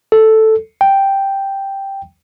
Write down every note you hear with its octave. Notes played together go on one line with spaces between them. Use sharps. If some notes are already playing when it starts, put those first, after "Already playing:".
A4
G5